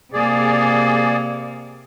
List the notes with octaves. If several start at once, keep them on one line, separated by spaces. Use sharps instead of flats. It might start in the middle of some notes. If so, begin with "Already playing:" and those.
C3 A#3 G#4 D5